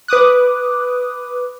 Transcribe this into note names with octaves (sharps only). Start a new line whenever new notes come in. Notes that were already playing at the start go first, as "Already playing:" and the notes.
B4 D6 D#6 F#6